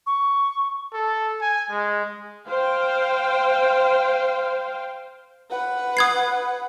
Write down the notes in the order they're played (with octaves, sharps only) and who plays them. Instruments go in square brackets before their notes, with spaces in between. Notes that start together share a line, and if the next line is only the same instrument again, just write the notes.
[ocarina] C#6
[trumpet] A4
G#5
G#3
[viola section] C5 F5 G5
[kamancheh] B4 F#5
[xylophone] D#6 G#6 C7